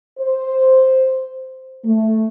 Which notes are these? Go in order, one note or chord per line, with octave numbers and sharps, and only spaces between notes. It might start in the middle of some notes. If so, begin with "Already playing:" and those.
C5
A3